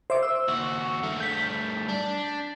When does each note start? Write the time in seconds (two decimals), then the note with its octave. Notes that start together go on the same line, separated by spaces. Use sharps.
0.10 C5 E5 D6
0.23 E6
0.48 D#2 F#4
1.03 G2 A3
1.20 G6 B6
1.89 D4